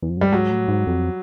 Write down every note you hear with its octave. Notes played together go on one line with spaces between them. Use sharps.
E2
F2
F#2
G2 G3
G#2 F#3
A2
G#2
F2